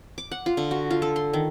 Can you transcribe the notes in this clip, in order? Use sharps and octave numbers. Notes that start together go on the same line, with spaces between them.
D6
F#5
F4
D3
F#4
F4
A4
C6
D#3